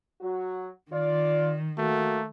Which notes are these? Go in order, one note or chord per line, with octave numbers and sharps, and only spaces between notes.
F#3 F#4
D#3 F4 D5
A3 A#3 F#4